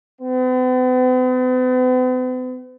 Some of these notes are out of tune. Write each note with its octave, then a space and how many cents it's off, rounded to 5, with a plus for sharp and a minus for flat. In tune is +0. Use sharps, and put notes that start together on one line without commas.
B3 +45